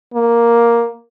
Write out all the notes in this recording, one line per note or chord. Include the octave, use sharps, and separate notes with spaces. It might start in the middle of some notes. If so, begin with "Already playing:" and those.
A#3